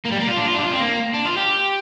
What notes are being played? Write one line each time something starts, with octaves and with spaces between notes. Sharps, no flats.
A#3
G3
A#3
F4
D4
F4
D4
G4
F4
C4
A#3
D4
F4
G4